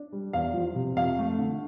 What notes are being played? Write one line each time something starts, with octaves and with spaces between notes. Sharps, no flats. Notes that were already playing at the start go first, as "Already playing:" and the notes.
Already playing: D4
G3
E2 F5
F3
C3
F2 F5
A3
D3